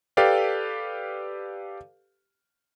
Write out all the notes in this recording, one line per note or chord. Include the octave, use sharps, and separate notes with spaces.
G4 A4 B4 D5 F5 G5